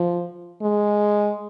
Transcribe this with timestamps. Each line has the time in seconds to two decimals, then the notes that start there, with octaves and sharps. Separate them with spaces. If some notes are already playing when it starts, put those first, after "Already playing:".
Already playing: F3
0.62 G#3